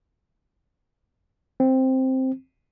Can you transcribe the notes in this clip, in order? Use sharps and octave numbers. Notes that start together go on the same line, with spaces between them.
C4